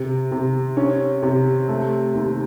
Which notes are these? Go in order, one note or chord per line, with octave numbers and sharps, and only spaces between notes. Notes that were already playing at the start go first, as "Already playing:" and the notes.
Already playing: C3
C3
C#4
C3
A3
D#2